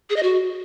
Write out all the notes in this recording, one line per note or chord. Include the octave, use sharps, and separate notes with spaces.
G#4
D#5
F#4